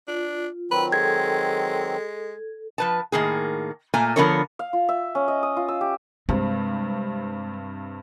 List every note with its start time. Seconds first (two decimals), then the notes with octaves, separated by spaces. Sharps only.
0.08 D4 F4
0.71 D#3 F#3 C4 B4
0.92 G#3 A4 G#6
2.78 F3 B4 A5
3.12 A2 D#3 A#3 G#4
3.94 A#2 A3 A#3 G#5 A#5
4.16 D3 F3 B3 D4 A#4 C#5
4.59 F5
4.73 F4
4.89 E5
5.15 C#4
5.28 D#5
5.43 D#6
5.57 F4
5.68 E6
5.81 G4
6.29 G2 C3 G#3